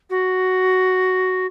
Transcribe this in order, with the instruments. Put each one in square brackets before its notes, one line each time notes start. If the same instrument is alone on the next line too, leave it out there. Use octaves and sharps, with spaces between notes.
[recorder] F#4